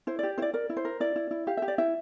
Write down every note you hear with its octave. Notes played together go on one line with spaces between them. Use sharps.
E4 C5
G4 D5
E4 C5 D5
A#4 D5
E4
C5
A#4
E4 D5
E4
E4
G4 F5
G4 E5
D5
E4 E5